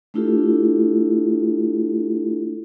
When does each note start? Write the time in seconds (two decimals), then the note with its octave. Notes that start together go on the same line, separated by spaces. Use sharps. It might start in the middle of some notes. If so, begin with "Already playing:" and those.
0.14 A3 D4 E4 F4 G4 A4